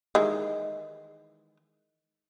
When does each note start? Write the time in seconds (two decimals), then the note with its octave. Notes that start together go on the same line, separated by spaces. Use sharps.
0.15 D#3 E3 G#3